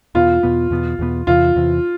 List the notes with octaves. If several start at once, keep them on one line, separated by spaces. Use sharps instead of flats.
E2 B2 B3 F4
E2 B2 B3
E2 B2 B3
E2 B2 B3
E2 C3 E3 F4
E2 C3 E3